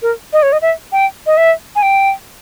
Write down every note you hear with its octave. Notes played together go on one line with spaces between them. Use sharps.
A#4
D#5
C#5
D#5
E5
G5
D#5
E5
G#5
G5